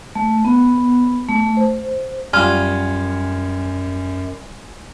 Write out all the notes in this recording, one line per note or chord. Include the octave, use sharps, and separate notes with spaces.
A3
B3
A3
C5
F#2 G3 F4 G#5 C6 F6 G#6